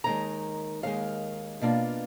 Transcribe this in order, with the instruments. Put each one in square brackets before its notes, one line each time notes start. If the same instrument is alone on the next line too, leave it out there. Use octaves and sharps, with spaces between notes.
[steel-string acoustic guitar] D#2 D#3 G#3 A#5
D#2 D#3 G#3 F5
B2 A#3 D4 F4